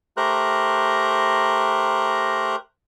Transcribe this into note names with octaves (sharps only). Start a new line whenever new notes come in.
A3 G4 A#4 C5 A#5 F#6